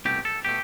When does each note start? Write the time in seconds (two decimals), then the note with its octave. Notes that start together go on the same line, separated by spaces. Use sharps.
0.05 C2 B2 A3 G4
0.25 A4
0.45 B2 A3 G4